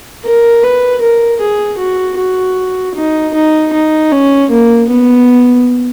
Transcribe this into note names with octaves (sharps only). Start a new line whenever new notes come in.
A#4
B4
A#4
G#4
F#4
F#4
D#4
D#4
D#4
C#4
A#3
B3